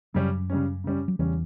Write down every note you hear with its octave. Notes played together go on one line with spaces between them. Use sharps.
F#2 C#3 F#3 G3 C#4
C#3 G3 C#4
C#3 G3 C#4
F#3
E2 C#3 E3 G3 C#4